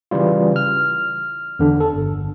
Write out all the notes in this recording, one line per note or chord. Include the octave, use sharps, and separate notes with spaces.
C#3 E3 G3 F4
F6
E2 D3 D4
A4
G1